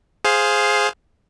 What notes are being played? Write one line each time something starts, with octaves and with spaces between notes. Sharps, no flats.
G#4 C5 F5